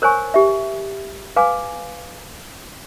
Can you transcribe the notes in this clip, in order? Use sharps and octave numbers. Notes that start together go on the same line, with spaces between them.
A#4 C5 C#5 G#5 C#6
G4 E5
B4 F5 G#5 D6